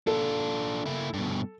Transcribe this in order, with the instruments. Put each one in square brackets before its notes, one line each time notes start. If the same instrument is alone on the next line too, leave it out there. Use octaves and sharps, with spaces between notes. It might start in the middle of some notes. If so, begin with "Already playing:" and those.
[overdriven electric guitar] D4 F4 [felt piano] A4
[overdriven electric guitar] A#3 E4
G2 B2